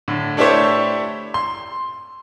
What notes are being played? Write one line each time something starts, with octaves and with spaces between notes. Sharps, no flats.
A2 D3
A3 D4 E4 G4 C5 C#5
C6